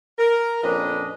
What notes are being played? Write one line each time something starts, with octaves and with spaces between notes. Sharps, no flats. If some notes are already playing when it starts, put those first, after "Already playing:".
A#4
F2 A#2 C#4 D4 B4 D#5